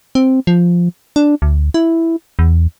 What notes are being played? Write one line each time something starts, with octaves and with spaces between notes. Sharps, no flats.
C4
F3
D4
D2
E4
E2